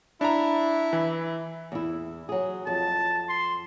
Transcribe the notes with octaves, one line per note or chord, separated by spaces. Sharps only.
D4 E4 A#5
E3
E2 E4
F#3 G#4
F2 A5
C6